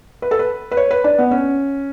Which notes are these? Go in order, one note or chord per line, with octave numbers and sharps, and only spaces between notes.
B4
A4
B4
B4
C#5
B4
D4
B3
C#4